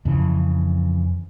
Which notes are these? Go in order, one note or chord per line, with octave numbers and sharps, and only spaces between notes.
F2 C#3 E3